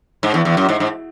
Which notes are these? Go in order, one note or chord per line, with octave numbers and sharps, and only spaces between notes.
G#2
E2
E2
F#2
G#2
G#2